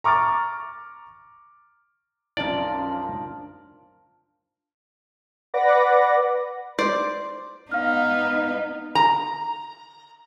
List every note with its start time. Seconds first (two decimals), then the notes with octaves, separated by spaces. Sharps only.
0.04 A#5 C#6 D6 F6 A6
2.37 B1 F#2 F3 D4 A#4 D5 A5
5.54 B4 D5 F#5 B5 D6 A#6
6.79 C5 D5
7.71 B3 D#4 F5 F6
8.95 A#5